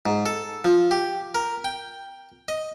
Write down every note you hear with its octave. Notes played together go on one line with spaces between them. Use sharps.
G#2
A4
F3
G4
A#4
G5
D#5